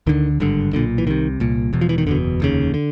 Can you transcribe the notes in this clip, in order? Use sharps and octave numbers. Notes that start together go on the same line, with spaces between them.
D2 D3 D#3
G#1 G2 D3
B1 A#2 D3
E3
C2 C3 D#3
C2 A#2
E1 E2 B2
F3
E3
D#3
F#1 E2 B2 D3
F1 D#2 C#3
D3